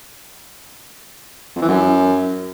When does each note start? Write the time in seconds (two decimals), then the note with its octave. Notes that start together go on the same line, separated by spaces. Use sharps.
1.56 F2
1.62 E3
1.68 F#2